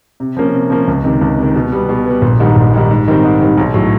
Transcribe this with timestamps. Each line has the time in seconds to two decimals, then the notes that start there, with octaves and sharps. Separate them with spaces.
0.20 C3
0.37 F3 A#3 C#4
0.54 C3
0.70 F3 A#3 C#4
0.87 C#2
1.04 C3 D#3
1.21 C#2
1.38 C3 D#3
1.56 B2
1.72 G3 B3
1.89 B2
2.06 G3 B3
2.22 A#1
2.40 G#2 D#3 G3
2.56 A#1
2.73 G#2 D#3 G3
2.91 G#2
3.08 D#3 G3 C4
3.25 G#2
3.41 D#3 G3 C4
3.58 B1
3.74 A2 F#3